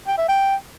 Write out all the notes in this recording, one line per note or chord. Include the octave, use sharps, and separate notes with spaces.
G5
E5
G5